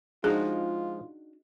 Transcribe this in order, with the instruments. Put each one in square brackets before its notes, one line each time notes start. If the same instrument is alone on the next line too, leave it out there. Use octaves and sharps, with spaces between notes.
[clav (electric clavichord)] F3 G#3 [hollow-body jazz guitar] D4 D#4 F#4 [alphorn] F4 [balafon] G#4